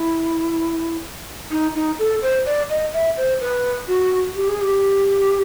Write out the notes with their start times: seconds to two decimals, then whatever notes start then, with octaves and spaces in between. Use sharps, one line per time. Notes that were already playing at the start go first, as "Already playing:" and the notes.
Already playing: E4
1.51 D#4
1.75 D#4
1.99 A4
2.22 C5
2.46 D5
2.70 D#5
2.93 E5
3.17 C5
3.40 B4
3.88 F#4
4.36 G4
4.48 G#4
4.61 G4